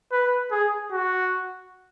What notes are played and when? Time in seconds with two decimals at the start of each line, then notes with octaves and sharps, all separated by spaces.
0.12 B4
0.51 G#4
0.92 F#4